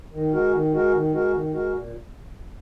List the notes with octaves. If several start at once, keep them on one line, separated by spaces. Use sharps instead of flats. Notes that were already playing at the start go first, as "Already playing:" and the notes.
D#3
G#3 F#4 A#4
D#3
G#3 F#4 A#4
D#3
G#3 F#4 A#4
D#3
G#3 F#4 A#4
A#2